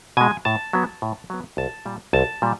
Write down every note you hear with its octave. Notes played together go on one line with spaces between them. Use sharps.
B2 G#3 G#5
A2 A5
F#3 B3
A2
F#3 B3
C2 A5
A#2 G3
C2 A5
A#2 G3